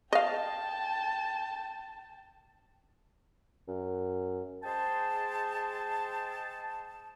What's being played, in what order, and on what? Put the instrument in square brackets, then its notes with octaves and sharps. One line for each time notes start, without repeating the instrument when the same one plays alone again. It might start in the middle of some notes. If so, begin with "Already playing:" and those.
[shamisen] D#5 F5 [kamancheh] G5 A5
[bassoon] F#2
[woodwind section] G#3 G#4 C5 G5 A5